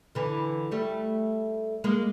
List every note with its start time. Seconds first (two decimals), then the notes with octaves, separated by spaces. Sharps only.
0.15 D3 E3
0.72 G3 A3
1.84 G#3 A#3